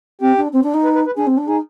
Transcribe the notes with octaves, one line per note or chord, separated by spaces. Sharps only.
C4 G4
D4
C4
D4
D#4
B4
B4
B4
D4 G#4
C4
D4
D#4 G#4